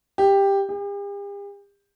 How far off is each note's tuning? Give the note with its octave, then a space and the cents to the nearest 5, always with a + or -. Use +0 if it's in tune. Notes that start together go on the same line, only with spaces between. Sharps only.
G4 +10
G4 +45